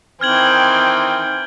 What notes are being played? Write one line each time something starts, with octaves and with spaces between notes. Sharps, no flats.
D#3 E3 C4 G5 F6 G#6 F#7